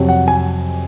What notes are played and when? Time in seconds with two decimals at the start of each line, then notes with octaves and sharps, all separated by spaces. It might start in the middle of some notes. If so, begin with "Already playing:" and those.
Already playing: F2 C3 F#3
0.09 F#5
0.28 G#5